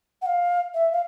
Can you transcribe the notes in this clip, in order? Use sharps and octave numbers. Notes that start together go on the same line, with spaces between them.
F#5
F5
E5
F5